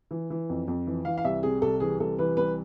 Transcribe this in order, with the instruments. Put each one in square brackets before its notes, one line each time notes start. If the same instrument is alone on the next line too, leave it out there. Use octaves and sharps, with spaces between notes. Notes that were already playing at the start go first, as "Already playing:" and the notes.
[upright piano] E3
E3
F2
F2
E3
E3 F5
F5
C2 E5
C3 G#4
C2 A4
E3 G#4
C2 A4
E3 B4
C2 B4